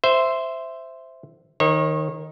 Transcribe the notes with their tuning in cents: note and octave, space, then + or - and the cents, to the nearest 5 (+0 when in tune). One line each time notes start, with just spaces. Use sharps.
C5 -5 E5 +5
D#3 +5 C#5 -35